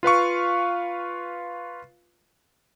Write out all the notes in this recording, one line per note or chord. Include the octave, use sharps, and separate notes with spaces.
F4 B4 F5 C#6